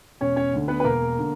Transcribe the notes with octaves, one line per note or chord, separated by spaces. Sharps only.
E1 C#4 C#5
C#4 C#5
D2 D3
B3 B4
B4
E1 A#3 A#4
D3